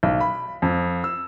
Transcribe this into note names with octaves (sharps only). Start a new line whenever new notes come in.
B1
B5
F2
E6